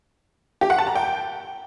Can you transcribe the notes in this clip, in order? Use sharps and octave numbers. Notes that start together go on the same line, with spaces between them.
G4
F#5
A5
A#5
G5